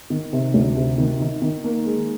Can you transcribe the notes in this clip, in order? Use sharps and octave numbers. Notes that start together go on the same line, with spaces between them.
D#3
C3
D2
C3
D#3
D#3
D#3
A#3
G#3